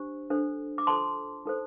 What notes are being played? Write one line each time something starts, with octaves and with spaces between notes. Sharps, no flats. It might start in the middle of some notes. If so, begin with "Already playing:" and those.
Already playing: D4 G4 C5
D4 A4 C5
D6
F4 A4 C5 A5 C6
D#4 A4 C5